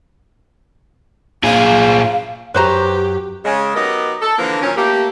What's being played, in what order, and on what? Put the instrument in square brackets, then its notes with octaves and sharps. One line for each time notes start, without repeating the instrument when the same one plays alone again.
[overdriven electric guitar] A#2 G#4 [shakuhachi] F5
[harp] F#2 C#6 [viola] G4 [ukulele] B4 C5 A#5
[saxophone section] C#3 G#3
F#3 B3 D#4 G4 A#4 D#5
A4
D3 E3 F3 A#3
A#2 D#3 F#3 C#4
A3 A#3 G4